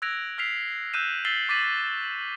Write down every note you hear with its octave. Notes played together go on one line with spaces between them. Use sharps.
E6 F#6 G#6 A#6 D7 F7
E6 F6 B6 C7 F7
E6 F#6 G6 D#7 E7
E6 A6 B6 C7 F#7 G7
C#6 D6 A6 B6 D#7 F#7